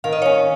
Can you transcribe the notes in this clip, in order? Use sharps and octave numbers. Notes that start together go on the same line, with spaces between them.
D#3 F5
D#5
C#4 C#5 F5